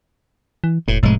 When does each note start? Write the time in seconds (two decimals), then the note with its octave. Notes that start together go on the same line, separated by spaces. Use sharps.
0.64 E3
0.88 E1 A2
1.03 F1 A2 G#3